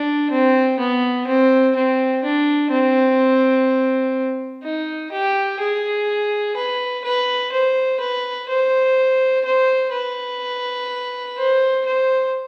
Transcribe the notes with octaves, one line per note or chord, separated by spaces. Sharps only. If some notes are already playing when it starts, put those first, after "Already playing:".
Already playing: D4
C4
B3
C4
C4
D4
C4
D#4
G4
G#4
B4
B4
C5
B4
C5
C5
B4
C5
C5